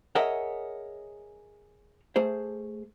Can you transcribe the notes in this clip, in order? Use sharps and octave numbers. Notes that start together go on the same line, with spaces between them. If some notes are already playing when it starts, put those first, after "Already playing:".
G#4 A#4 C#5 D#5 E5 F#5
A3 G#4 C5